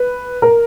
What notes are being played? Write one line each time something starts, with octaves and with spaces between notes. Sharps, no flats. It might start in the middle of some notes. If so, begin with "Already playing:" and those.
Already playing: B4
A#4